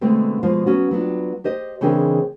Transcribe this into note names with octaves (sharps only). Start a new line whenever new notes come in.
B2 D3 G#3 A3 C4
B2 F3 G#3 F4 F5
F#3 B3 C#4 F#4
F#3 B3 D4 F4
G4 C5 D#5
C#3 E3 C4 D4 G#4 A#4